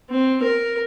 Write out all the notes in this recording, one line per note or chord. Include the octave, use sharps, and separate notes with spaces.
C4
A#4